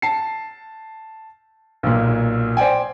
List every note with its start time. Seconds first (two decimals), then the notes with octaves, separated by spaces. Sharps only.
0.02 A5 C7
1.83 B1 A#2
2.57 C5 D5 G5 G#5